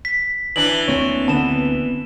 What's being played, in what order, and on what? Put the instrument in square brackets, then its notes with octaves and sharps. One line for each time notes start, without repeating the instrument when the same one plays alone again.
[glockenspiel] B6
[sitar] E3 D4 [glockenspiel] F#7
[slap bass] D2 A#3 C4 [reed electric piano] C#5
[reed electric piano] D3 B3 [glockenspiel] A5 E7